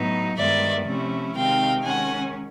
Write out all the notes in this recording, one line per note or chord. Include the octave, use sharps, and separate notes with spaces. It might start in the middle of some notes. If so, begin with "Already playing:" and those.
Already playing: A2 F#3 B3 D#4
G2 D#3 G#3 B3 D5 E5
C3 F3 A3 C#4 E4
C3 D#3 G#3 C4 D#4 F5 G5
D#3 G#3 C#4 F#5 G#5